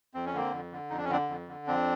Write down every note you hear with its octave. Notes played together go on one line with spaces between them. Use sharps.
F2 C4
C#4
D3 A#3 C4
F2
D3
F2 D#4
D4
C#4
D3 C4 D4
F2
D3
F2 C4 D4